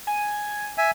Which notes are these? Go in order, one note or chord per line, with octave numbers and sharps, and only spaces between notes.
G#5
E5 G#5